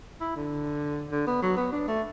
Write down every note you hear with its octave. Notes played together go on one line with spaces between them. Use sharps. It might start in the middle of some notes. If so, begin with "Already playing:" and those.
E4
D3
D3
B3
F#3
B3
D4
A3